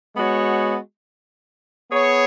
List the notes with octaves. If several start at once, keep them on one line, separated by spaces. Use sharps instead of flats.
G#3 B3 F#4 C#5
B3 G#4 C#5